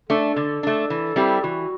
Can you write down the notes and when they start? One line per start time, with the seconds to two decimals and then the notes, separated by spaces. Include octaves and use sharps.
0.09 A3 D4 A4
0.36 D3
0.63 A3 D4
0.90 E3
1.16 G3 C4 E4 G4
1.43 E3 F#4